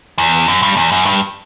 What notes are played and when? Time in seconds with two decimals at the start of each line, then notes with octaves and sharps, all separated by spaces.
0.18 E2
0.48 F#2
0.63 G2
0.77 E2
0.92 F#2
1.06 G2